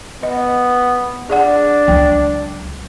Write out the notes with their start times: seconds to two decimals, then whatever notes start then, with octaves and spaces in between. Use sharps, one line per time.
0.23 B3 D#5
1.30 D4 G#4 D5 F#5
1.88 C#2 F#3 G5